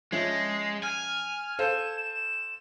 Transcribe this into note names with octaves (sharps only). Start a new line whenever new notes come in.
F3 G#3 C#4 E5
C7
G#5 F6
A4 C5 F5 E7
E7